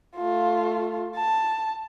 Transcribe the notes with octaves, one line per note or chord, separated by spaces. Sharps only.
A3 F4
A5